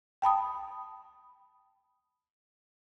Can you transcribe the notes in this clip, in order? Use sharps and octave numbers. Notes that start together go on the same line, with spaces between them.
G5 A5 B5 D#6